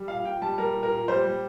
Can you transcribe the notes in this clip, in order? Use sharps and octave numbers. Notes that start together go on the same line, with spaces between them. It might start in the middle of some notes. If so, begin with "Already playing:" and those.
Already playing: G3
A#2 F5
A#2 G5
G3 A5
G3 A#4
A#2
A#4
A#2
G3 C5
G3